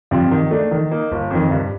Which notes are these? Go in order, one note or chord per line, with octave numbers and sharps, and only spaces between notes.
G2 F3 C4 F4
D#3
A3 D4
D#3
A#3 D#4
G1
F2 D#3
G2